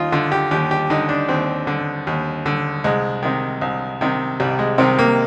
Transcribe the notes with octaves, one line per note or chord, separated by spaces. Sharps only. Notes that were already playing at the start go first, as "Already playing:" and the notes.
Already playing: D#2 D#4 F4
D3 F4
G4
D#2 G4
G4
D3 D#4
D4
D#2 C4
D3
D#2
D3
C2 G#3
C3 D#3
C2
C3 D#3
C2 G3
G#3
C3 D#3 C4
A#3